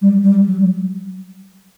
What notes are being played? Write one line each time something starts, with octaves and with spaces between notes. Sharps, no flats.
G3
G3
F#3